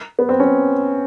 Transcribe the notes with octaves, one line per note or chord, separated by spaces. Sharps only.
B3
C4
C#4